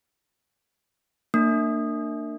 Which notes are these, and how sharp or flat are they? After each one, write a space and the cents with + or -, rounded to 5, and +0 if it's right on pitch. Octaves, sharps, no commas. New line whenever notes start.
A#3 -30 D4 +25